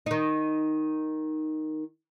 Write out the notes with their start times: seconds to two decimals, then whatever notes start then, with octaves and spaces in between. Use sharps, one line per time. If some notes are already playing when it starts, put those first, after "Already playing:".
0.06 D#3 D#4